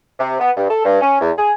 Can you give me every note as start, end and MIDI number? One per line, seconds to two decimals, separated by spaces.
0.19 0.36 48
0.40 0.51 59
0.57 0.69 43
0.70 0.84 69
0.85 0.99 43
1.01 1.21 61
1.21 1.31 40
1.38 1.53 68